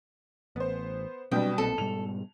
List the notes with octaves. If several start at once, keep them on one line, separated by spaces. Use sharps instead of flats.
A1 B3 C5
B2 F#3 G3 C4 D4 G5
B1 A#2 C4 A4
G#2 B2 G3 F7